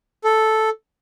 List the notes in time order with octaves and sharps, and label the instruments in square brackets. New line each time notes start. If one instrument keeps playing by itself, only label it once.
[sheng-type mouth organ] A4